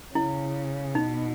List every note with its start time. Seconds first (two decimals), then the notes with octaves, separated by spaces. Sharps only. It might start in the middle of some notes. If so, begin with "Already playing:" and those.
0.15 C#3 E4
0.95 B2 D#4